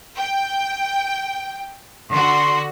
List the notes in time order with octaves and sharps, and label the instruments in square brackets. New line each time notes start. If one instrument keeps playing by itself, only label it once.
[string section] G5
[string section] D3 F#4 [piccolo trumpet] C6